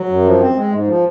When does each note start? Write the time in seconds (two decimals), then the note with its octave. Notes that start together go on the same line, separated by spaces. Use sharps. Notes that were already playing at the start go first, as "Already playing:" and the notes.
Already playing: F#3
0.09 F#2
0.25 F3
0.40 C4
0.56 G#3
0.72 G#2
0.88 F3